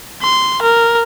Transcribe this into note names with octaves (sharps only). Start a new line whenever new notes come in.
C6
A#4